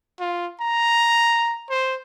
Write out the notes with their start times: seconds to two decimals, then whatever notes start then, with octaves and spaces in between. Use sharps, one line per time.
0.20 F4
0.61 A#5
1.70 C5